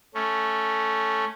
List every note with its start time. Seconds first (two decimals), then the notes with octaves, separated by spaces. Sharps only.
0.14 A3 C#4